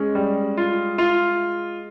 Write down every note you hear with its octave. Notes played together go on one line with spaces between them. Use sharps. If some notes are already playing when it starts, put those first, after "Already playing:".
Already playing: G#3 C#4
G3
F4
F4